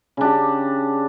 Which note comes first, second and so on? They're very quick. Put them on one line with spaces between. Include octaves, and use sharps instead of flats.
C#3 D4 G4